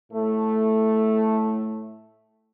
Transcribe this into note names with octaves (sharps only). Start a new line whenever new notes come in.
A2 A3